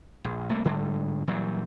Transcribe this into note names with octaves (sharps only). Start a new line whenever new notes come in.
A#1
C2 A3 A#3
G1 G#2 D3 G3
A#2 E3 F#3 G3